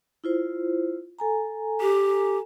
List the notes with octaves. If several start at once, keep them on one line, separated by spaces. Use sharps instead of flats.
E4 F4 C5
A4 G#5 A#5
G4